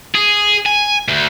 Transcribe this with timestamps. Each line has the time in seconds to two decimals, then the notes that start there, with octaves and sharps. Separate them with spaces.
0.15 G#4
0.66 G#5
1.09 D2